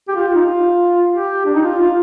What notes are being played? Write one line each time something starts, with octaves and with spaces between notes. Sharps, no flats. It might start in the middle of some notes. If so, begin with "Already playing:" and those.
G4
F4
D#4
F4
G4
D4
D#4
F4
F4